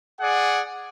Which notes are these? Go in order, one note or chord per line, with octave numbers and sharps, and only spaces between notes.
G#4 D5 F#5